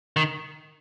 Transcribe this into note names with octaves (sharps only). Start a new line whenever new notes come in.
D#3